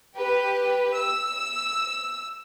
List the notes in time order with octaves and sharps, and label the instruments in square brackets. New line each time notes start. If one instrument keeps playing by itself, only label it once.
[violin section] G4 B4
E6